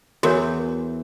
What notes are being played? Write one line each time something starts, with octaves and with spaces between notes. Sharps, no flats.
E2 F#4 A#4 C#5